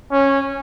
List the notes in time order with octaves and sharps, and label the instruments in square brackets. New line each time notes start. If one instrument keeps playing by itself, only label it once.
[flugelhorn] C#4